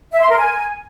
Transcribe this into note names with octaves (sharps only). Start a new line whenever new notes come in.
E5
C6
A#4
G#5